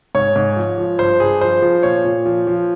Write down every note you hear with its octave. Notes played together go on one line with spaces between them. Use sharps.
G#2 C#5
G#2
F3
F3
G2 C5
G2 G#4
F3 C5
F3
A#2 C#5
A#2
F3
F3